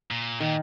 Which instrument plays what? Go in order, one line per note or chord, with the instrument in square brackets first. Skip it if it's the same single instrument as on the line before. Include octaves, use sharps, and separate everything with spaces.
[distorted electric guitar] A#2
[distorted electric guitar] A#2 [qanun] D#3